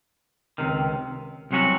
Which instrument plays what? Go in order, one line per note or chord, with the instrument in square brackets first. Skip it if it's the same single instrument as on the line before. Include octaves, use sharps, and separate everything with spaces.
[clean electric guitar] C#2 C3 D#3
C2 C3 F#3 C#4 F#4